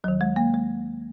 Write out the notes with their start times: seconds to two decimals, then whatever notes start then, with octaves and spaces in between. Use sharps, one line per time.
0.04 D#2 D#3 F#3
0.21 G#3
0.36 A#3
0.54 G#3